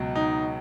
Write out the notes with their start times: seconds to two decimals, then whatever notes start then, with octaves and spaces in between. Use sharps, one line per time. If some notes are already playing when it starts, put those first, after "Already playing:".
Already playing: C#2 B2 F#3
0.15 D#4